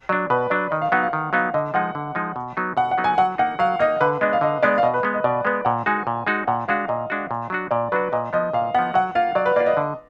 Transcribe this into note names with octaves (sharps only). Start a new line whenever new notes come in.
F#3 D4 D5
B2 B4
F#3 D4 D5
D#3 D#5
F5
F#3 B3 D#4 F#5
F5
D#3
F#3 B3 D#4 F5
D3 D#5
F3 G#3 D#4 F#5
D3
F3 G#3 D#4
B2
F#3 B3 D#4
B2 F#5
F#5
F#3 B3 D#4
G#5
F#3 F#5
A#3 D#4 F#5
F#3 F5
A#3 D#4 D#5
D3 B4
G#3 B3 D4 D#5
F5
D3 D#5
G#3 B3 D4 D5
F5
B2 D#5
B4
G#3 B3
D#5
B2 D5
G#3 B3 B4
A#2 F#5
G#3 D#4 F#4 G#5
A#2
G#3 D#4 F#4
A#2 F#5
G#3 D4 F#4 F5
A#2 D#5
G#3 D4 F#4
A#2
F#3 D4 F#4
A#2 D5
F#3 D4 F#4 B4
A#2 D#5
F3 B3 D#5
A#2 F5
F3 B3 F#5
F#3 F#5
A#3 F4 F5
F#3 D5
B4
A#3 F4 D5
D#5
D3